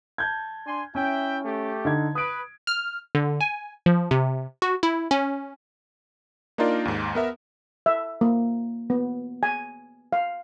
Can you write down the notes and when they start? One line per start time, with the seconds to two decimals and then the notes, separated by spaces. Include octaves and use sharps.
0.18 A5 G6 G#6
0.66 D4 G#5 C6
0.95 C#4 E4 E5 G5
1.44 A3 G4
1.85 D3 D#4 G#6
2.15 B4 D#6 D7
2.67 F6
3.15 D3
3.41 G#5
3.86 F3
4.11 C3
4.62 F#4
4.83 E4
5.11 C#4
6.58 A#3 D4 D#4 F4 A#4 D5
6.85 D#2 G#2
7.15 B3 A#4 E5
7.86 E5
8.21 A#3
8.90 B3
9.43 G#5
10.13 F5